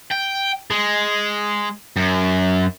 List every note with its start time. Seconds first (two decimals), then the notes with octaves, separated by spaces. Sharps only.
0.11 G5
0.71 G#3
1.97 F#2